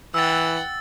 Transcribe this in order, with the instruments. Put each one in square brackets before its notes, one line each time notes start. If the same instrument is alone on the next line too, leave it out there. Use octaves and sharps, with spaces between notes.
[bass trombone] E3 [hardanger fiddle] F#5 G5 [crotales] E6 A6